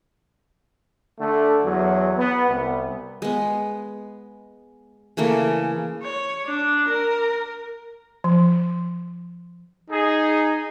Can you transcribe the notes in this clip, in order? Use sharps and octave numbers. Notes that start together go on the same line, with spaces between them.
D3 A3
E2 F#3
B3
C2
G#3 B3
C#3 E3 A3 A#3
C#5
D4
A#4
F3
D#4 G#4